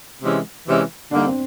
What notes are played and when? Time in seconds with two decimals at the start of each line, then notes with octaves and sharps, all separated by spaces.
0.23 C3 E3 G#3 C#4
0.68 C3 E3 G#3 C#4
1.11 D3 G3 A#3 D4 D#4
1.26 C4